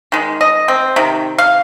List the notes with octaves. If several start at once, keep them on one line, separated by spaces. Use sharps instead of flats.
D#3 G#3
D#5
C4
C3 D#3
F5